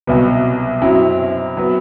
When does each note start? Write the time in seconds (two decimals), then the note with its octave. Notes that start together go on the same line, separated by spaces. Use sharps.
0.07 C2 B2 F#3 B3
0.82 F#2 F#3 C4 E4
1.57 F#3 B3